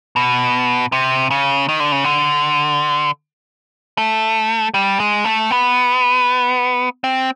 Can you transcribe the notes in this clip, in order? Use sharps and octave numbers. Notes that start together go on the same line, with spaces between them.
B2
C3
C#3
D#3
D3
C#3
D3
A3
G3
G#3
A3
B3
C4